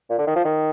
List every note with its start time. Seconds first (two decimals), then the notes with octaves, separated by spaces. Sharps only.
0.10 A#2
0.19 D3
0.27 D#3
0.36 F3
0.45 D#3